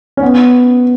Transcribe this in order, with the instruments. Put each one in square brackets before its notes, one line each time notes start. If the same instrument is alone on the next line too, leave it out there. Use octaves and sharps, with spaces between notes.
[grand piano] C#4
B3